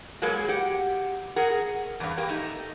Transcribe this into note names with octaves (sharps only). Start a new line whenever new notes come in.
F#3 G#3 A#3 B3 G#4
G4 F#5
G#4 A#4 F#5
E2 G2
A#3 G4
A3 D#4